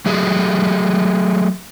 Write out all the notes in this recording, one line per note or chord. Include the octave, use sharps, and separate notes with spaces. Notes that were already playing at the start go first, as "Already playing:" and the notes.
F#3 A3 G4 G#4